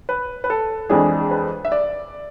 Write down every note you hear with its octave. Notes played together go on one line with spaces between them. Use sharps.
B4
B4
A4
F2 E3 G#3 D4 G#4
B4
E5
D5